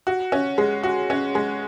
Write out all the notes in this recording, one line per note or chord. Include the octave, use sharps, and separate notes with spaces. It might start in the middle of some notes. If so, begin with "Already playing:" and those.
F#4
C#4
G#3
F#4
C#4
G#3